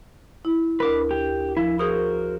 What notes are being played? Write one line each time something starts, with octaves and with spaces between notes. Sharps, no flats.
E4
D2 D4 A#4 B4 D6
G4
F3 E4
F#4 G#4 A#4 C5 D#6